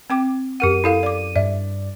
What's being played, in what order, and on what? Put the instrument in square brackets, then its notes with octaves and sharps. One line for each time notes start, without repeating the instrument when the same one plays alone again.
[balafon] C4 G5 D6
[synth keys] F#2 D#7 [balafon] G4 A#4 F#5
[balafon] E4 A4 F5
D5 D6
[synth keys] G2 D5 [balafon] E5